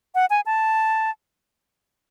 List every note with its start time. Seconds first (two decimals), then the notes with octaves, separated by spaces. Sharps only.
0.15 F#5
0.30 G#5
0.46 A5